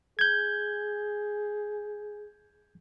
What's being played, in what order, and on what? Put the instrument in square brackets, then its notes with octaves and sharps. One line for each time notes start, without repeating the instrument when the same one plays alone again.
[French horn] G#4 [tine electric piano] G6 G#6